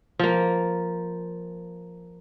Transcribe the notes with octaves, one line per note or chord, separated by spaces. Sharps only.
F3 A#3